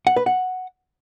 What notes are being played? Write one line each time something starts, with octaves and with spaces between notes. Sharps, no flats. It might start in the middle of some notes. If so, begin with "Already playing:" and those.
F#5
B4
F#5